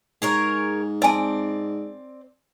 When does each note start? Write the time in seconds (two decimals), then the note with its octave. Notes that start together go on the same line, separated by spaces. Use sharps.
0.22 G#2 G#4 A#4 C#5
1.02 C4 D5 D#5 G#5 A5